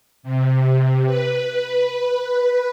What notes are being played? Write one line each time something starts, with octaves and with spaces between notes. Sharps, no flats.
C3
B4